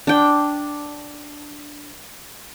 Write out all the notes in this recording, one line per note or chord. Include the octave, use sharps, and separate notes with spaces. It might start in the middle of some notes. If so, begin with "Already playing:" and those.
D4 G5